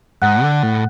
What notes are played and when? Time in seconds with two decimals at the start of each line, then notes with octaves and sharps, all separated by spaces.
0.22 G#2 F#5 F#6
0.42 D3
0.63 A2